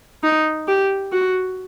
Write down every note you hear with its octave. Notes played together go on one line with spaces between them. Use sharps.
D#4
G4
F#4